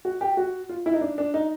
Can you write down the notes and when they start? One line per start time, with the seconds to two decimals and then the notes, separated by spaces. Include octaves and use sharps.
0.05 F#4
0.21 G4
0.37 F#4
0.69 F4
0.86 E4
0.94 D#4
1.01 D4
1.18 D4
1.34 D#4